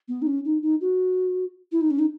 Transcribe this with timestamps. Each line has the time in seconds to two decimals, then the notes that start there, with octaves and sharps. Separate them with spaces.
0.08 B3
0.22 D#4
0.27 C#4
0.45 D#4
0.63 D#4
0.81 F#4
1.72 E4
1.81 D#4
1.91 C#4
1.99 D#4